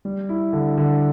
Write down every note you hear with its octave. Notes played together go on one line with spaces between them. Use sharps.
G3
E4
D3
D3